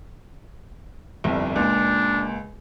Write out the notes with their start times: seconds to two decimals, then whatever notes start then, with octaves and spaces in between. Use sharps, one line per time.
1.24 G1 C2 F2
1.56 C#2 A#2 D4